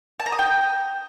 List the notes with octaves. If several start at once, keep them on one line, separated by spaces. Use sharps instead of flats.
A5
A#5
D#6
G5